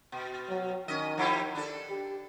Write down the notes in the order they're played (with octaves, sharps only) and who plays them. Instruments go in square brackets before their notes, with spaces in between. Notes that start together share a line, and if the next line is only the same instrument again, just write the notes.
[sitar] B2
[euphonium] F#3
[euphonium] D#3 [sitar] C#4 D#5
[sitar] F3 E4 G4
D4 A4
[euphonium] G4